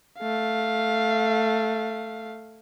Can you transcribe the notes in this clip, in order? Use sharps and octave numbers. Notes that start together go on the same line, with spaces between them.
A3 F5